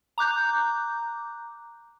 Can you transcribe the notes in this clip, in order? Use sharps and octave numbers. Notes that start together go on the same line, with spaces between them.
A#5 D6 F#6 G6